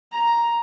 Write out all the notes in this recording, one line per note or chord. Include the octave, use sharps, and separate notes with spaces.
A#5